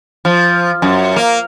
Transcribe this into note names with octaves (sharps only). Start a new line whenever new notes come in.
F3
F#2
A#3